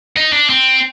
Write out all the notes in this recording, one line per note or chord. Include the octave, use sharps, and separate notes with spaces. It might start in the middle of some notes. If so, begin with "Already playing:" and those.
D#4
D4
C4